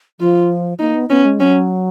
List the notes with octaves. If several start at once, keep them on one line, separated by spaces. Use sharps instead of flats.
F3 F4
A#3 D#4
B3
B3 C#4
G#3
F#3 C#4